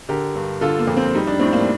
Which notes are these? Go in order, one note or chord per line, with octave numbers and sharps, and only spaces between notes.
D3 G4 A#4
G2
D3 F4 A4
A#3
F2
C4
G3 D#4
D4
A2 C4
A#3 D4